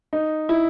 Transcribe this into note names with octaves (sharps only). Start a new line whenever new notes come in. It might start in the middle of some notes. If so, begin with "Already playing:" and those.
D#4
E4